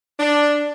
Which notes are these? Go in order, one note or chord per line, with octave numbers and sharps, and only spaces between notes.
D4